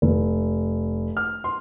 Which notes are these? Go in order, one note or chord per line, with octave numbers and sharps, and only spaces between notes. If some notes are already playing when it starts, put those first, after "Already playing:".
F1
F6
C6